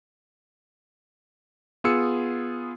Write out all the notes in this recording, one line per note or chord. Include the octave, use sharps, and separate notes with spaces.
B3 F4 G#4 D#6 E6 C#7